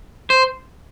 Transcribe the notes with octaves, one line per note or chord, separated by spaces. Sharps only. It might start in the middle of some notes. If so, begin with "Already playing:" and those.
C5